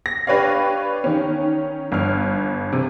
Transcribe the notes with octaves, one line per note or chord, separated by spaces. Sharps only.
A#6
D4 G4 B4 C#5 D5 F5
D#3 C#4
G1 F6
C3